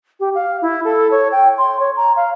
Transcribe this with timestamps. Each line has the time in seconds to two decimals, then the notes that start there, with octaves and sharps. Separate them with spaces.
0.20 G4
0.35 F5
0.62 E4
0.85 A4
1.11 C#5
1.32 G5
1.58 C6
1.80 C#5
1.96 A#5
2.16 F5